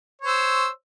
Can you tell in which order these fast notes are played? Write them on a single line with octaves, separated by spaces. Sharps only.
C#5 C5 E6